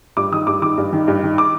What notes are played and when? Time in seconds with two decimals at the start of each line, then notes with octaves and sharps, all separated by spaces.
0.17 G2 D6
0.32 D#3 D#6
0.47 G2 D6
0.62 D#3 D6
0.78 G2
0.93 D#3
1.08 G2
1.23 D#3
1.38 D6